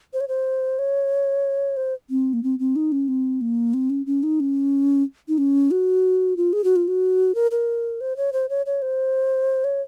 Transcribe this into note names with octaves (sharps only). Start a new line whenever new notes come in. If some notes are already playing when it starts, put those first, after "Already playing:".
C5
C#5
C5
C#5
C5
C4
A#3
C4
C4
D#4
C#4
C4
A#3
C4
C#4
C#4
D#4
C#4
D#4
C#4
F#4
F4
G#4
F#4
F4
F#4
A#4
A#4
C5
C#5
C5
C#5
C#5
C5
C#5